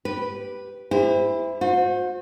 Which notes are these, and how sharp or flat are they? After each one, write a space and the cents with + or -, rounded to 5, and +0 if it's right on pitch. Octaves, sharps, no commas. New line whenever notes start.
G4 -5 B4 +0
E4 +0 G4 +45 C5 -30
F#4 -40 C5 +0